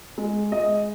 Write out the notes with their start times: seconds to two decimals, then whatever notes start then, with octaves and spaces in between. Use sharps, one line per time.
0.18 G#3
0.52 G#3 D#5